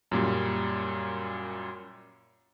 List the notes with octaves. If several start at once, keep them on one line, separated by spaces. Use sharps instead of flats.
F#2 A#2 G3